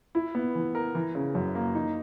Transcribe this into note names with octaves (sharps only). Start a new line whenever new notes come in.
E4
B3
E3
A#4
E3
C#3
F#2
A#3
D#4